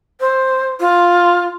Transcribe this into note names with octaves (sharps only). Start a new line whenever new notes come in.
C5
F4